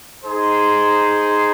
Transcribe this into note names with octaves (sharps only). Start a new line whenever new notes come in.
D#4 G#4 C5